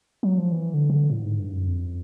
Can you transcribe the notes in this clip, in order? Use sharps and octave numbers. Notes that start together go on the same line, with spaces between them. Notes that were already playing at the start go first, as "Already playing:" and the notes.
F#3
F3
E3
D3
C#3
D3
A2
G#2
G2
F#2
F2